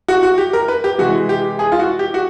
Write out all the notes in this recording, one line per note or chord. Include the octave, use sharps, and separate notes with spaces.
F#4
F#4
G4
A#4
B4
G4
C3 E3 G#3 F#4
G4
G#4
F4
F#4
G4
F#4